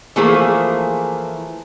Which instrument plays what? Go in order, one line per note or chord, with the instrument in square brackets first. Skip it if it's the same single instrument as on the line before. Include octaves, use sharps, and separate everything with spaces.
[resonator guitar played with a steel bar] E3 F3 A3 A#3 G#4 C5